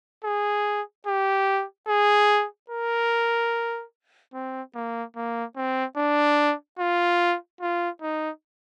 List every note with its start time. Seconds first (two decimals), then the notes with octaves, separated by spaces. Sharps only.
0.24 G#4
1.07 G4
1.88 G#4
2.70 A#4
4.33 C4
4.75 A#3
5.16 A#3
5.56 C4
5.97 D4
6.79 F4
7.61 F4
8.02 D#4